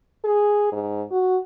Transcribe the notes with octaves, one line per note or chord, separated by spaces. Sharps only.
G#4
G#2
F#4